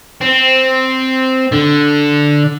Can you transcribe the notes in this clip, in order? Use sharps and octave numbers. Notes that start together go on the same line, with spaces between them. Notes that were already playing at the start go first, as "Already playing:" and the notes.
C4
D3